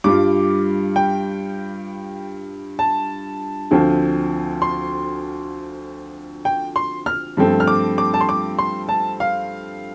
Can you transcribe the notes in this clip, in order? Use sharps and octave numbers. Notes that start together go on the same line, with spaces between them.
G2 G3 F4 D6
G5
A5
D2 D3 F3 C4 F4
C6
G5
C6
F6
G2 F3 A3 C4
F6
D6
D6
A5
C6
D6
C6
A5
F5